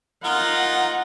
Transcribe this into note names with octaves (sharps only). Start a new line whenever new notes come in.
D#4 F4 A#4 F#5